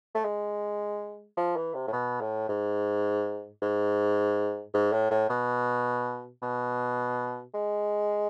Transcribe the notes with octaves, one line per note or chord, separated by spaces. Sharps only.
A3
G#3
F3
E3
C3
A2
B2
A2
G#2
G#2
G#2
A2
A2
B2
B2
G#3